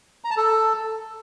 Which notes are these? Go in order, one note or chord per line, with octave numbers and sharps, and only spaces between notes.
A#5
A5
A4